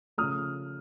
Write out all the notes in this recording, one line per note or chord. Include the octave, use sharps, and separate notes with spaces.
C#3 F3 A3 D#6 F6